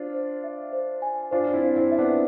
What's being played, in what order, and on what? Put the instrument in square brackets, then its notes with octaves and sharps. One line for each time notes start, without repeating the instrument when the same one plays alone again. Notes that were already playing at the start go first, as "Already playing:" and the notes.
Already playing: [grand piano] D4 F4 [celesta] C5
[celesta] C5
E5
C5
G#5
[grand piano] D4 F4 [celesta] C5
[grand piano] F4
C4 E4
[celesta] C5
[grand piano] C4 E4
[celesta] E5
[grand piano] B3 D4